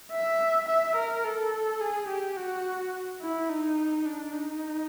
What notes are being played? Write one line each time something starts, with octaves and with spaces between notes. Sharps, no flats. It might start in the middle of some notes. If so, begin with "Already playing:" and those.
E5
E5
A#4
A4
G#4
G4
F#4
E4
D#4
D4
D#4